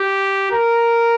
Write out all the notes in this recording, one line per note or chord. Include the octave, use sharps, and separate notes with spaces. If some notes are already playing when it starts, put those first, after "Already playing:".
Already playing: G4
A#4